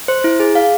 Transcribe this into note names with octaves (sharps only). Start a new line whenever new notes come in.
C5
E4
G#4
F5